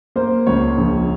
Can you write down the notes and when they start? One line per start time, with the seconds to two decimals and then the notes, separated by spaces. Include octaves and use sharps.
0.16 A#3 C5
0.47 C#2 C#5
0.77 A#1